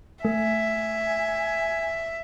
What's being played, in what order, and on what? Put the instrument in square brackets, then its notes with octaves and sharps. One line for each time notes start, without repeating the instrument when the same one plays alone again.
[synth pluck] A3 [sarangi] E5 [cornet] G#5